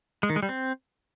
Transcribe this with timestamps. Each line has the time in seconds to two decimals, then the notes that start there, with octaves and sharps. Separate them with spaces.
0.23 G#3
0.30 D#3
0.36 G#3
0.43 G3
0.49 C4